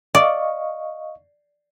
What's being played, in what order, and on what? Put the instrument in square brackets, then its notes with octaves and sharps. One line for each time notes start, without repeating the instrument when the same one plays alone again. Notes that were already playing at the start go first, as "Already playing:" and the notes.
[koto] D5 [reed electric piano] D#5 F5 C#6